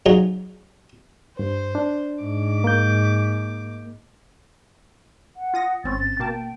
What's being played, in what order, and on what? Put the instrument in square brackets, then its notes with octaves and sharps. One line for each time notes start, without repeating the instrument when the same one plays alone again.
[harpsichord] F3 F#3 D#4 G#4
[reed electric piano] G2 [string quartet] C5
[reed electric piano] D4
[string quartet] G#2 D6
[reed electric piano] A#3 G6
[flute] F#5
[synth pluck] F4 D#6 A#6
[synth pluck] G#1 C4 C#4 [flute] A6
[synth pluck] B2 A#3 A5 [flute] G5